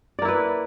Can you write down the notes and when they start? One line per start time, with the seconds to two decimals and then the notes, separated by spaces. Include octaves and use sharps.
0.19 D5
0.22 A#3
0.25 E4
0.28 B4